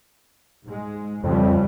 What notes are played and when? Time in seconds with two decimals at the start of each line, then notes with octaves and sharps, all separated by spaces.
0.65 G#2 G#3
1.24 F2 C#3 E3 G3